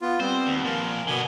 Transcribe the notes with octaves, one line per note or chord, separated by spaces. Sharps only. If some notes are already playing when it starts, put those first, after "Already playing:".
B3 F4
G3 B3 C4 C5
D#2
A#2 F3 A#4
B2 D3 B3 G#5